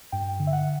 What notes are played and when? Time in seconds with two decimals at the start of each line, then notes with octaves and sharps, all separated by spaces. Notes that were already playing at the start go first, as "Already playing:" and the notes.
0.12 G2 G5
0.40 D3
0.47 E5
0.53 F#5